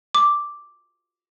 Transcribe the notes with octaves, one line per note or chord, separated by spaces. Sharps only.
D6